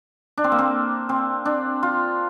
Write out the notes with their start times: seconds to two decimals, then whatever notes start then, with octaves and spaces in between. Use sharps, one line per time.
0.37 D4
0.44 C4
0.52 A#3
0.59 C4
1.09 C4
1.45 D4
1.83 F4